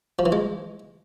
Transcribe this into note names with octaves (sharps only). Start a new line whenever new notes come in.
F3
E3
G#3